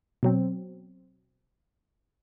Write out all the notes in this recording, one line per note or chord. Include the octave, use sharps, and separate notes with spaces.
B2 F#3 C4